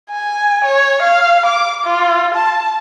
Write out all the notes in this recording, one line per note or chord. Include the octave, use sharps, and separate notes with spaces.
G#5
C#5
F5
D6
F4
A5